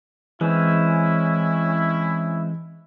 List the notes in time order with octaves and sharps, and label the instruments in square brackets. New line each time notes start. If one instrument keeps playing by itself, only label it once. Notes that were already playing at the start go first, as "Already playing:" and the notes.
[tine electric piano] E3 [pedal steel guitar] G#3 C4 [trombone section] C#4 E4